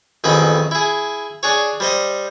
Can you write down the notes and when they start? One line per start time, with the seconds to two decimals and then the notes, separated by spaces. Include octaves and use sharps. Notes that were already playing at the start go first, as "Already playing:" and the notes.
0.24 A1 F2 D#3 G#4 B5
0.71 E4 G#4
1.43 D4 G#4 C#5
1.80 G3 C5 D#5